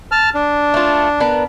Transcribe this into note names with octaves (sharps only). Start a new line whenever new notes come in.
A5 F6
D4
A3 F4
B3 D4 A#4